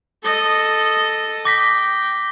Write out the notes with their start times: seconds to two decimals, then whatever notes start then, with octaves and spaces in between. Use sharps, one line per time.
0.23 A4 D#5
1.45 G5 D6 A#6 B6